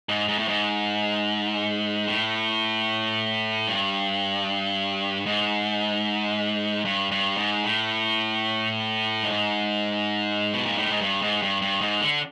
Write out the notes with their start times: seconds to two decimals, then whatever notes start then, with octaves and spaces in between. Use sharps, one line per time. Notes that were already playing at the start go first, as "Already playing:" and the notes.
0.09 G#2
0.28 G#2
0.39 A2
0.48 G#2
2.08 A2
3.67 G2
5.26 G#2
6.85 G2
7.11 G2
7.37 G#2
7.64 A2
9.23 G#2
10.54 B2
10.65 A#2
10.78 A2
10.90 G#2
11.01 G2
11.22 G#2
11.42 G2
11.62 G2
11.81 G#2
12.01 D3